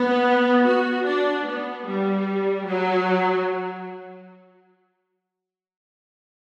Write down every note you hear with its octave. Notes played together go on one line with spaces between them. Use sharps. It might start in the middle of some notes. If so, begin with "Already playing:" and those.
Already playing: B3
F#4
D4
B3
G3
F#3